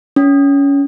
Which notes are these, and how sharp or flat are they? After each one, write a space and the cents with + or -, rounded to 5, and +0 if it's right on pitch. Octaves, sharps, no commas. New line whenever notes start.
C#4 +20